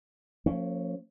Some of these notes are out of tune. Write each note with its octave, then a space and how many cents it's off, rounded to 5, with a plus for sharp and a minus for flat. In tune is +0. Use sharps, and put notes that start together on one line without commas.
F3 +25 A#3 -30 C#4 +0